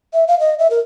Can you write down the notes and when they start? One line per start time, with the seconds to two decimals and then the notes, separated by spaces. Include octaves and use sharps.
0.13 E5
0.27 F5
0.40 D#5
0.59 E5
0.70 A#4